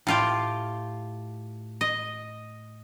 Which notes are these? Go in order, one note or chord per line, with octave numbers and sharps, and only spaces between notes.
A2 F4 G4
D#5